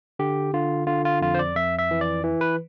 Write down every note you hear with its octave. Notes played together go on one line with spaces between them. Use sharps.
D3 G4
D3 F4
D3 F4
F4
F2 F4
C5
D5
F2 E5
E5
E3
D5
E3
B4